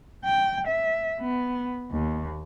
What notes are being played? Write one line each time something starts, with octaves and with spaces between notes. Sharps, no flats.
G5
E5
B3
D#2